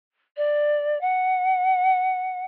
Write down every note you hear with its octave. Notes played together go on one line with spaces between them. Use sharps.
D5
F#5